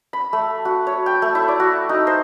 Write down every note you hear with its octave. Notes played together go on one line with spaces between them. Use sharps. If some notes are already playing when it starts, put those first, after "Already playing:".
B5
A3
F#4
C#5
G5
A3
E4
D5
F#4
D#4
C5